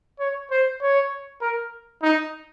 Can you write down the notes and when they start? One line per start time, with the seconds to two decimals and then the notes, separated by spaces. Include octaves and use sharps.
0.19 C#5
0.51 C5
0.81 C#5
1.41 A#4
2.03 D#4